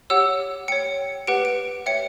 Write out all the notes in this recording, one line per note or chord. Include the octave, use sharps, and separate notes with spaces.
G4 C#5 F#5 E6
C#5 G5 C#7
G4 B4 F#5 D7
D7
C#5 E5 G5 C#7